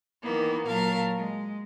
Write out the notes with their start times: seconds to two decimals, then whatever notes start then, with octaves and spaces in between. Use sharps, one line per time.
0.22 D#3 E3 A#3 B3
0.66 A#2 F#3 A#4 F5 A5
1.16 G#3